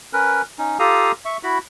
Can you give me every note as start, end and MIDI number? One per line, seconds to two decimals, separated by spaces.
0.13 0.42 61
0.13 0.42 70
0.13 0.42 71
0.59 0.78 61
0.59 0.78 63
0.79 1.12 65
0.79 1.12 67
0.79 1.12 69
0.79 1.12 77
0.79 1.12 82
0.79 1.12 87
1.25 1.37 76
1.25 1.37 85
1.43 1.58 64
1.43 1.58 66
1.43 1.58 83